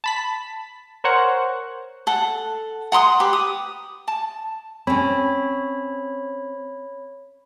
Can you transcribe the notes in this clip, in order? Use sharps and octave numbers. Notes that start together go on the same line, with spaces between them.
A5 B5 B6
A#4 C5 C#5 F#5
A4 F#5
F#5 A#5 C6 D#6
G4 B4
D#6
A5
C4 C#4 C#5 B5